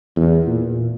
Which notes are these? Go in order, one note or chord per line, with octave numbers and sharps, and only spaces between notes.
E2
A#2